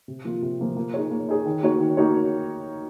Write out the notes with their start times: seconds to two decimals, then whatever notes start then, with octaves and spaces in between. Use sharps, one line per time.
0.08 C3
0.25 F3 A#3 F4
0.42 C3
0.59 F3 A#3 F4
0.76 A#3
0.94 D#4 G#4 C#5
1.11 A#3
1.29 D#4 G#4 C#5
1.46 D#3
1.63 A#3 D#4 F#4 C#5
1.80 D#3
1.97 A#3 D#4 F#4 C#5